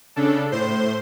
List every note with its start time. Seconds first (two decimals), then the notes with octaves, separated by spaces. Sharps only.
0.16 C#3 D4 A4
0.52 A2 C5 C6